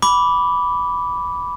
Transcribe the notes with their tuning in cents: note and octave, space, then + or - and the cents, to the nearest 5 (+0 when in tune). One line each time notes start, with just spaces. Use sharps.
B5 +0 D6 -15